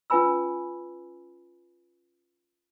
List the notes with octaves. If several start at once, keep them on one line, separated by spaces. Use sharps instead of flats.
C#4 F4 B4 G#5 B5 E6